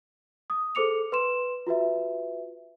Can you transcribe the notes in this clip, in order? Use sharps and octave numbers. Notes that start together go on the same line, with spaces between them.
D#6
G#4 A4 C5 D6 C#7 F7
B4 C6 E7
F4 F#4 B4 E5